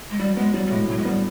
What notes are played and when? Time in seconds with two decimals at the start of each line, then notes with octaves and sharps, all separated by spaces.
0.10 G#3
0.19 F#3 G3
0.36 G#3 B3
0.54 F#3 G3
0.66 G3
0.71 A2 G#3
0.88 A2 F#3
0.98 G#3
1.05 G3 B3